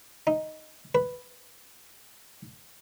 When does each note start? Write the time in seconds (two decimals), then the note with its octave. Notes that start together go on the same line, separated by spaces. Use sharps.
0.27 D#4
0.95 B4